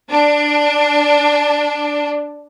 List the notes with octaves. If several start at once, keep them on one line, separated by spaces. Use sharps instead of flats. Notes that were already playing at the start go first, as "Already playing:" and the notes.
D4